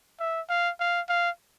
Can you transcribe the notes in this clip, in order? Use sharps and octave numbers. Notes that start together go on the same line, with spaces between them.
E5
F5
F5
F5